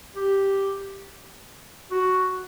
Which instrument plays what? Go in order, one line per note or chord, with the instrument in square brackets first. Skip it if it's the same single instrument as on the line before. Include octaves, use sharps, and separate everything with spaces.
[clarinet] G4
F#4